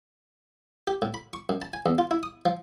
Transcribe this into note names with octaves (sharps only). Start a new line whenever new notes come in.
G4
A2
B5
C#6
F#2
A5
G#5
E2
F4
E4
D#6
F3